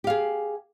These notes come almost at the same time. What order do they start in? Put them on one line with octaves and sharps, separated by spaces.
G4 F5 G#4